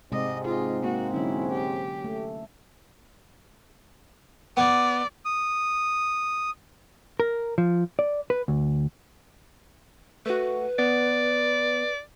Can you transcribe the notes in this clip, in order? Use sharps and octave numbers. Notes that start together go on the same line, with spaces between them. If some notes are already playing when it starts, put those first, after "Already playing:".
G#2 C3 G#3 C4 D5 D#5
F4 G#4 D#5
A#3 F#4
D3 F#3 C#4 E4
G4
A3
B3 D5
D#6
A#4
F3
D5
B4
D2
A3 F#4 B4
B3 D5